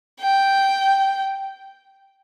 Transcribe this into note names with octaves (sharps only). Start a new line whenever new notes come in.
G5